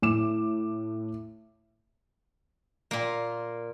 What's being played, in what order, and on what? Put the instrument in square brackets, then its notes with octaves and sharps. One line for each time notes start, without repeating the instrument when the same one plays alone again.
[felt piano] A2 D6 E7
[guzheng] A#2 A#3